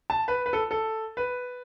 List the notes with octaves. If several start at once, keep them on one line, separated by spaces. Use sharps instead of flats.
A5
B4
B4
A4
A4
B4